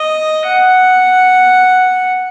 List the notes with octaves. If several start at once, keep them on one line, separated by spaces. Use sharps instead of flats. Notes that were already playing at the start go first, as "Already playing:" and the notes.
Already playing: D#5
F#5